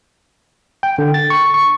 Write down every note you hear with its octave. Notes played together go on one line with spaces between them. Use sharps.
G5
D3
A6
C#6
C#6